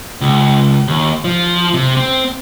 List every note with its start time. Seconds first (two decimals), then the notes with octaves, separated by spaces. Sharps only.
0.21 C#2
0.88 D#2
1.24 F3
1.74 C3
1.97 C4